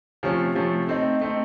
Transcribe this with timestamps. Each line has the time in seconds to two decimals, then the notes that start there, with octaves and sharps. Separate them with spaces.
0.23 C3 F3 A3 C#4
0.55 C3 F3 A3 C#4
0.88 A3 C4 D#4
1.21 A3 C4 D#4